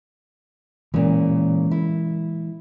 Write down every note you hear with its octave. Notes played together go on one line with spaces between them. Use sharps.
A#2 C#3 E3 G#3
E4